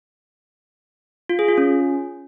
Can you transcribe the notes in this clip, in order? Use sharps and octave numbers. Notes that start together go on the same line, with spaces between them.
F4
G#4
F4
C#4